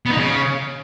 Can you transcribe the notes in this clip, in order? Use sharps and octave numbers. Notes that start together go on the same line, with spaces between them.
B3
D#4
C#3